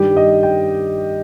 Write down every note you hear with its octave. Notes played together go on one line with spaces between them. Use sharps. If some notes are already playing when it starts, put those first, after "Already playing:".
Already playing: G2 D#3 G3 G4
D#5
G5